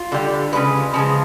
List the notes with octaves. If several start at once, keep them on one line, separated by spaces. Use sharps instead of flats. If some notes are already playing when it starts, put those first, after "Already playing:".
Already playing: F4
D3 G3
C#3 F3 G#3 B4
C#3 F3 G#3